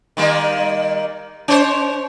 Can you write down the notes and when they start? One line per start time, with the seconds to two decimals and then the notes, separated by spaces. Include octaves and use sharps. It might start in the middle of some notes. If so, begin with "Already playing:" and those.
0.17 D#3 G3 A#3
1.48 C#4 C5 C#5